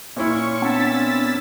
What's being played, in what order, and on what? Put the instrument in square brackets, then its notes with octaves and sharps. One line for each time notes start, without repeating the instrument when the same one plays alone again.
[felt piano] A#2 C#4 E4 [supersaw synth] C#6
[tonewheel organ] B3 C4 D4 [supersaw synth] E6 A6 B6